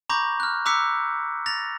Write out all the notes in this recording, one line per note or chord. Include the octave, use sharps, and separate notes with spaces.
A#5 B5 C#6 D6 G6 A#6
F6 F#6
A#5 D6 E6 F#6 B6 C#7
A6 A#6 F7